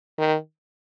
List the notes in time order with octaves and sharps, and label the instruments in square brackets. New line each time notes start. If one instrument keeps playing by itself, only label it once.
[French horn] D#3